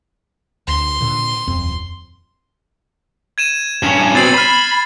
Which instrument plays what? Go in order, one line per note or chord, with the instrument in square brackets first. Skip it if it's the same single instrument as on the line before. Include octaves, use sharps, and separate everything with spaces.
[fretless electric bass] D2 [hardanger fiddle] C6
[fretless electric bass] A#2 D3
D#1 F2 C4
[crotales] G#6 D#7 E7
[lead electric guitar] G2 C#4
[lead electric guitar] B2 C4 [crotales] A6 C7 F#7
[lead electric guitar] B5 [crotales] F6 A6 D#7